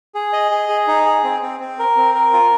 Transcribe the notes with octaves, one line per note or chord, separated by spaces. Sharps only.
G#4
D#5
G#4
G#4
D#4
G#4
C4
C4
C4
A#4
C4
A#4
F4